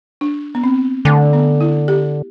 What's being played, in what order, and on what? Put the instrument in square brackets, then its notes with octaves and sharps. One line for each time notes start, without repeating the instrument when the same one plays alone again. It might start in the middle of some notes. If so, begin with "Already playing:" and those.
[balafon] D4
B3
C4
[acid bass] D3 [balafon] A3
[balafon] B3
E4
G4